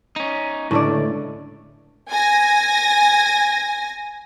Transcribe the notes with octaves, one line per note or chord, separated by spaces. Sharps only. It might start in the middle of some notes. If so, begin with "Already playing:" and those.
C#4 D#4
C#2 A2 D3 A3 D5
G#5 A#6